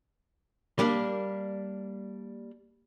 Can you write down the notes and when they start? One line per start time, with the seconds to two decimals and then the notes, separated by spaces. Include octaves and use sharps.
0.79 G3 A#3 D4